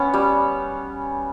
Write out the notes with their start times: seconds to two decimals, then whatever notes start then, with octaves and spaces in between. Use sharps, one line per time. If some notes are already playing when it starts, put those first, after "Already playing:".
Already playing: B3 C#4
0.14 G3